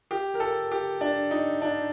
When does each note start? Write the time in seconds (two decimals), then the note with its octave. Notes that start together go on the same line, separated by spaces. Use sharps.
0.11 G4
0.34 A#4
0.40 A4
0.71 G4
1.01 D4
1.31 D#4
1.62 D4